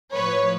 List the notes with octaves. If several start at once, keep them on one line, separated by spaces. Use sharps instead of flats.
A2 F3 B4 C#5